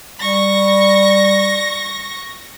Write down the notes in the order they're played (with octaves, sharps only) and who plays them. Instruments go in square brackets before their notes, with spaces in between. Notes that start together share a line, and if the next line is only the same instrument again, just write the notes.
[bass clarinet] G3 [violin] C#6 A#6